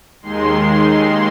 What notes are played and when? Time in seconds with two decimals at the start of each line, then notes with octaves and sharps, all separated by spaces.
0.22 D#2 D#3 G#3 C6
0.80 C6